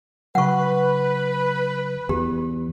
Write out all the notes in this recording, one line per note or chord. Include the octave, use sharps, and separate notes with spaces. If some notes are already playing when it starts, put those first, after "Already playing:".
C#3 F#3 B4 F#5 C#6
E2 G4